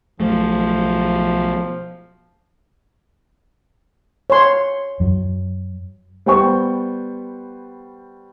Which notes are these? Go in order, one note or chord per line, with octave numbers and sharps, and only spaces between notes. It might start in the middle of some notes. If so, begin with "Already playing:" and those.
B1 F3 F#3 A3
C#5 C6
F#2 F#3
G3 B3 C5 G5 C#6